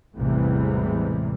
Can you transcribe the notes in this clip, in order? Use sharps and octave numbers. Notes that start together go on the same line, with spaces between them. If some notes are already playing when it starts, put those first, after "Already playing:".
A1 E2 C3 E3 G3 G#3